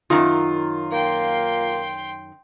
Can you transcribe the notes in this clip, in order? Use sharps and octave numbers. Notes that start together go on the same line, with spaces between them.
F#2 D#3 F4
A#3 G5 C6